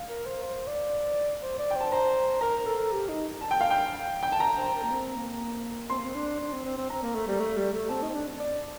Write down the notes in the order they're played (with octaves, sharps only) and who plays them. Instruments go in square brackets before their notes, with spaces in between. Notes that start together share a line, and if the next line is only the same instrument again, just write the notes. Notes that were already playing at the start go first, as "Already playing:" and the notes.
Already playing: [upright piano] F5
[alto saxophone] A#4
C5
C5
D5
C5
D5
[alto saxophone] C5 [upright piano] G5
[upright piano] A5
[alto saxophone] C5 [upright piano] A#5
[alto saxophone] A#4 [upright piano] A#5
[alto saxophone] A4
G4
D#4
[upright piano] A5
G5
F5
G5
G5
A5
A#5
[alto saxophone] C5
A#4
A#3
C4
A#3
[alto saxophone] C4 [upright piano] C6
[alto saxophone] A#3
C4
D4
D4
C4
C4
C4
[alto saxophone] C4 [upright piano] A#5
[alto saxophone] A#3
A3
G3
A3
G3
A3
[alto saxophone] C4 [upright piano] A5
[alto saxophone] D#4
C4
D4
D5